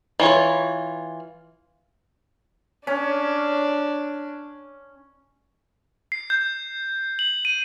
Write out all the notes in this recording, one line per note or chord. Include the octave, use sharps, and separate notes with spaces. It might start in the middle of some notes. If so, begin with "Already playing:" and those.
E3 F4 C#5
C#4 D4
C7
G6
F#7
D#7